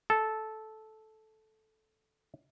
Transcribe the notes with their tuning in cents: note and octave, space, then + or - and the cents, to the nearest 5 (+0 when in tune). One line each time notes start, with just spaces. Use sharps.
A4 -10